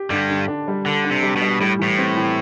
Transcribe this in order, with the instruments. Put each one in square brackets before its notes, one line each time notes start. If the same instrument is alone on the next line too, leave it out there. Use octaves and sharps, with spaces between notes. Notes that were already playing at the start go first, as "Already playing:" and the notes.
Already playing: [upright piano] G4
[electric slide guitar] G2 G3 [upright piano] D3
[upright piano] D3
D4
G3
[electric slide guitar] D3 [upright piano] A4
[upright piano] D4
[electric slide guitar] C3
[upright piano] G3
[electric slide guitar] B2
[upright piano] G3
[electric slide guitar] A2 [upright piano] G3
[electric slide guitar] A2 [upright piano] E3
[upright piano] C4
E3